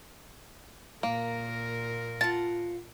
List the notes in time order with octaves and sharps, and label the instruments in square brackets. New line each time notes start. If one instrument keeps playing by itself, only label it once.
[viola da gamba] A#2 A#4 [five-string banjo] A#3
[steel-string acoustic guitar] F4 F#5 [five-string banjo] A5 [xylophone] A6